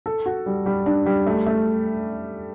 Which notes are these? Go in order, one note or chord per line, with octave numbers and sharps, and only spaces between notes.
A4
F#4
G3
G3
D4
G3
A3
A3